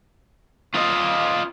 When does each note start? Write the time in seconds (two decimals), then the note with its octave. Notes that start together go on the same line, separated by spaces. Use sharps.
0.75 F4 D#5